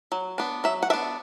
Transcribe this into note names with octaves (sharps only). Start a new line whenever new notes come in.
F#3
B3 D4
F#3 E5
F#5
B3 D4 E5